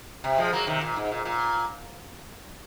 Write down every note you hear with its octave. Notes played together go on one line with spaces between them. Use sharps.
C3
F3 G#3
F#3 A#3
C3 D#3
A#2
G#2
A#2
A#2